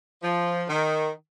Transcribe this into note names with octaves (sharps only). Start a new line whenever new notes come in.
F3
D#3